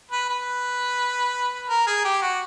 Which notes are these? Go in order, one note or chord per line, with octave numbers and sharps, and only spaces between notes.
B4
B4
A#4
G#4
G4
F#4